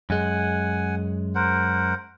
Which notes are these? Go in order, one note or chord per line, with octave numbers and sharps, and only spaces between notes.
F#2 G#3 F#5 G#5
A#4 C5 F#5